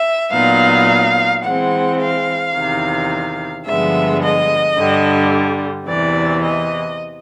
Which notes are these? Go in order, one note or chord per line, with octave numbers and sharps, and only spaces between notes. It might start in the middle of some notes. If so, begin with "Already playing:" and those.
Already playing: E5
A#2 F#3 B3 D#4 F5
E3 G#3 C4 F#5
F5
E2 C3 D#3
G2 D3 F3 G#3 B3 E5
D#5
G2 D3 G3
E2 C3 E3 D5
D#5